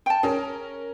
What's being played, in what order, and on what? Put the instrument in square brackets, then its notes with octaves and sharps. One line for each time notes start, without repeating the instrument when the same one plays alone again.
[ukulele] G5 A5
[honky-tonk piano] C#4 A#4 [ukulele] G#4